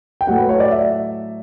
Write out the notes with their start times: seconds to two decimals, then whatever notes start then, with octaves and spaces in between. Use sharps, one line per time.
0.21 G5
0.27 A2 F#3 A3 F#5
0.38 B4
0.49 C#5
0.60 D5
0.71 E5